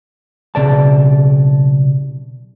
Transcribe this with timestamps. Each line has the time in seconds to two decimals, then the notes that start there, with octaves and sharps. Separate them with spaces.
0.55 B1 C#3 D5 A5